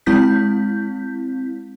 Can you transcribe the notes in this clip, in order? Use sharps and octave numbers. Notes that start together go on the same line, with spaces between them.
G#3 C4 E4 G6 B6